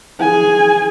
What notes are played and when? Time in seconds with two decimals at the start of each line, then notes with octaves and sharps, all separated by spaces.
0.21 G#4 G#5